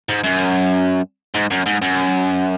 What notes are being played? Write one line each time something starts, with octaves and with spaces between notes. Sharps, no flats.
G#2
F#2
G#2
F#2
G#2
F#2